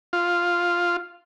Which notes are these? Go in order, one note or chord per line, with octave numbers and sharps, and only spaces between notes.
F4